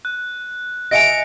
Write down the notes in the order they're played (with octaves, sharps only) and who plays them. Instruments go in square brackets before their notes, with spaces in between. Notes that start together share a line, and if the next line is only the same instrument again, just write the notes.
[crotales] F#6
[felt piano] D#5 E5 G#5 [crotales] A#6 C#7 F7 [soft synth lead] D7